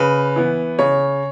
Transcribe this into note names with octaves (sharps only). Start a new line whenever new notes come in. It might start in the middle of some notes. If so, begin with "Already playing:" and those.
Already playing: C#3 B4
E3 B3
C#3 C#5